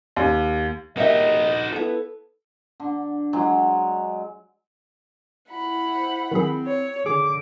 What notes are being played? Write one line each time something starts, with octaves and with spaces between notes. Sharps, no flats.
D#2
A#3 D#4 F#4 G4 D#5 E5
B3 E4 A4
D3
F#3 G#3
E4 F#5 B5
C5
D#3 F#3 C4 G#4
C#5
D3 G#4 D6